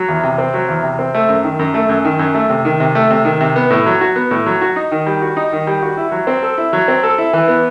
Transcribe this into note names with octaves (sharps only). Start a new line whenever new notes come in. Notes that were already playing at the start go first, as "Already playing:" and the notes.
Already playing: F#3
E2
C3
C4
F#3
E2
C3
C4
A3
F#2
D#3
F#2
A3
F#2
D#3
F#2
A3
C3
D#3
C3
A3
C3
D#3
C3
B3
A2
F#3
F#4
B3
A2
F#3
F#4
D#4
D#3
G3
F#4
D#4
D#3
G3
F#4
E4
F#3
C4
A4
E4
F#3
C4
A4
E4
E3
B3